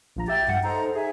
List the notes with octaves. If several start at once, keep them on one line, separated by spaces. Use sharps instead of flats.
A#1 F3 A#5
G4 E5 G5 A6
G2 F#5
D#4 A4 C5 A#5
G#4 E5 G#5